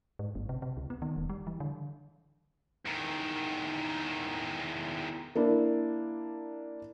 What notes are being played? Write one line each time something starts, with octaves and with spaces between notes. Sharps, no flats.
G#2
G1
C3
C3
C#2
B3
D#3
E1
G3
E3
D3
E2 D#3
A#3 D4 E4